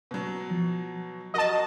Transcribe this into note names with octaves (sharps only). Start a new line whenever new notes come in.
B2 F#3
F3
F#4 A#4 D#5 A5